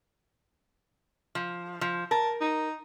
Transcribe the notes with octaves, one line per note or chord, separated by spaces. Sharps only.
F3
F3
A#4 A5
D#4